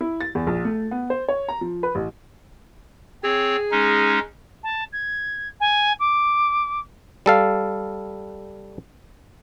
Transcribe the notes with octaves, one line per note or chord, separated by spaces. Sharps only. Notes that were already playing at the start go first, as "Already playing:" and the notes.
E4
A6
E2
A#1
A3
B3
C5
C#5
A#5
F3
B4
A1
C4 G#4 C#5
G#3 C#4 D#4
A5
G#6
G#5
D6
G3 A4 F5